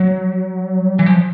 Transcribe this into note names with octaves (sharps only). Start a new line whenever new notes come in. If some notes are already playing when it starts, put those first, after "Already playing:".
Already playing: F#3
E3
F3